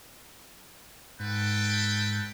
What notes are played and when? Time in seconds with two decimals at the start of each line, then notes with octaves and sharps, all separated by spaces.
1.20 G#2 A4 B4 G5